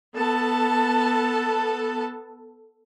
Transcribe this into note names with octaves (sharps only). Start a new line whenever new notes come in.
B3 A4 A5